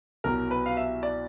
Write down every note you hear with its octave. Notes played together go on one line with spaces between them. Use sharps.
C2 B2 F#3 A#4
B4
F5
E5
D5